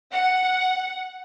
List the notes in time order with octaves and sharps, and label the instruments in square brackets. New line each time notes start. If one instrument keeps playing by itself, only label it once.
[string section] F#5